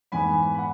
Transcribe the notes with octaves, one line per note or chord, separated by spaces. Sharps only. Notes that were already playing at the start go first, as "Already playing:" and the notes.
G#2 E3 B3 G#5 B5
B5
F#5